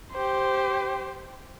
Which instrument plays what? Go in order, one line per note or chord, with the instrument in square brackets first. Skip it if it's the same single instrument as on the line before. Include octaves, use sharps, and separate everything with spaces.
[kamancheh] G4 C5